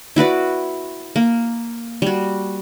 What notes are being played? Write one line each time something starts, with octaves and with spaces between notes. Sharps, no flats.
E4 F#4 B4 D5
A#3
G3 F#4